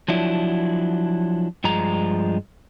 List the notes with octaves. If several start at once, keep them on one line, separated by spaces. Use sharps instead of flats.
F3 F#3 D4 E4
G2 F3 G#3 A#5